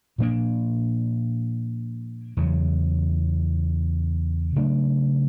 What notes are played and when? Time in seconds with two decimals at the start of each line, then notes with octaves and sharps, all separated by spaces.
0.18 A#2 F3 A#3 D4
2.37 E2 C#3 F#3
4.56 C#3 F#3 A3 D4